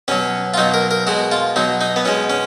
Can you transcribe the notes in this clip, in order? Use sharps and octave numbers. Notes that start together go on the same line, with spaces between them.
B2 F#3 C#4
F4
B2 F#3 D#4
A#4
A#4
B2 G#3 F#4
F4
B2 F#3 D#4
D#4
B3
B2 G#3 C#4
C#4